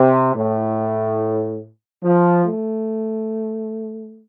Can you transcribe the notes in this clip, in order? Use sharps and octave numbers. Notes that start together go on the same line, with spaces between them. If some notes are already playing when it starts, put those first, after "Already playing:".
Already playing: C3
A2
F3
A3